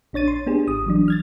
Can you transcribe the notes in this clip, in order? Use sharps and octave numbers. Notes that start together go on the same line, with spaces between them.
A#1 D4 C#5 A6 D#7
C6
B3 D4 G4 G#4
G#1 D#6
E3 F#3 D4
F6 G#6 A6